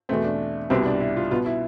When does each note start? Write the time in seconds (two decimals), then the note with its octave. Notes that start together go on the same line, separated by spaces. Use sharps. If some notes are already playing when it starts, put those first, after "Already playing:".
0.09 E2 B2 A3 C4
0.25 D4
0.70 C2 B2 G3 B3 C4
0.79 E4
0.86 D4
1.00 E4
1.16 F4
1.31 B2 B3 F4
1.46 E4